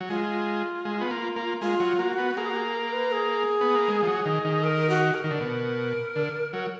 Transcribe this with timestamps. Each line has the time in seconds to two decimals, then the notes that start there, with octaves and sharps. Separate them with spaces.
0.01 F#3
0.09 G#3 F4
0.85 G#3
1.01 B3
1.11 A#3
1.36 A#3
1.60 G#3 F4
1.80 F#3
1.99 A#3 F#4
2.18 B3
2.37 A#3 G#4
2.49 F#4
2.56 G#4
2.75 A#4
2.93 B4
3.12 G#4
3.61 B3
3.75 A#3
3.88 G#3
4.03 F3
4.07 F#3
4.26 D#3
4.45 D#3
4.64 A#4
4.90 F#4
5.14 A#4
5.24 D#3
5.31 D3
5.40 B2
6.16 D3
6.53 F#3